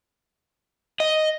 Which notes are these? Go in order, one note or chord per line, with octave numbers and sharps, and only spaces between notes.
D#5